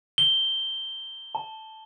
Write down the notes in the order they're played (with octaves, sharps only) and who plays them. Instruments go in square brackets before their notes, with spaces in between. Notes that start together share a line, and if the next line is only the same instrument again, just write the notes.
[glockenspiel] G7
A5